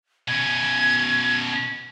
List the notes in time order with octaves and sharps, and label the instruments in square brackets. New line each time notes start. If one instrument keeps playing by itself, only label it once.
[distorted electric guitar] B2 C#4 [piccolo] G#6